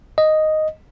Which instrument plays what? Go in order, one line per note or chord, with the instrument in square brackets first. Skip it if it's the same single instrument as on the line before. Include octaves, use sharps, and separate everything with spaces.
[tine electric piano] D#5